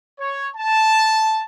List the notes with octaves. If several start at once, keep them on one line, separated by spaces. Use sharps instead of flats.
C#5
A5